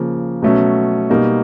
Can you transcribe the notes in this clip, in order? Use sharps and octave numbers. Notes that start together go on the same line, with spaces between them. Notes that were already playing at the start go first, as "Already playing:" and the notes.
Already playing: C#3 F3 A#3
B2 F#3 A3 C#4
B2 G3 A#3 D#4